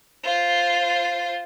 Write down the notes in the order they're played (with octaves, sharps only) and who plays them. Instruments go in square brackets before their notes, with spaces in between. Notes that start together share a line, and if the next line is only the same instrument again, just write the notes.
[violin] F4 C5